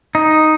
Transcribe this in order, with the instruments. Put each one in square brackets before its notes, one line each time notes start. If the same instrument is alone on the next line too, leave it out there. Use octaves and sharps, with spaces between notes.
[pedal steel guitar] D#4